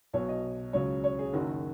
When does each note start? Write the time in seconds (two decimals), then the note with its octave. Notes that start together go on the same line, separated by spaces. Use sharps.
0.13 B1 B2 F#3 C#5
0.29 D#5
0.73 C#2 C#3 F#3 C#5
1.04 C#5
1.19 G#4
1.33 F#1 F#2 D#3 F#3 F#4